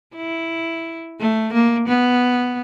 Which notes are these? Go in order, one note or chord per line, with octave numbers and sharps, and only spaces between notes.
E4
A3
A#3
B3